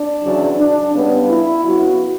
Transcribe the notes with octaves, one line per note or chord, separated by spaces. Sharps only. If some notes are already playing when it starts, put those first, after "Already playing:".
Already playing: D4
E2 C#3 F#3
D4
C#3 G3 B3
E4
C#3 F#3 B3 F#4